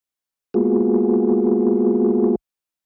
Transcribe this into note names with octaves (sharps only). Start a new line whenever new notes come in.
G#3 A#3 B3 F4 F#4 G#4